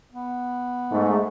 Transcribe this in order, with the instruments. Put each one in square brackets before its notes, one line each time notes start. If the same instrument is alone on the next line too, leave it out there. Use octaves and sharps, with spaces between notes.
[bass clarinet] B3
[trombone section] G#2 A3